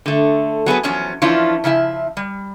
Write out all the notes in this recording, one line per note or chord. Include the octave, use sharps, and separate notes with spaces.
D3 A3
F#3 B3 G#4 B4
E2 F3 F#3 C#4
E3 F3 C#4 D4 E4 F4
C#3 F3 E4 E5
G3